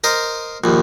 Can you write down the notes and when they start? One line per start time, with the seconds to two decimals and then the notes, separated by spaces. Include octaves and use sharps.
0.04 A#4 C5 D#5
0.64 A#1 D#2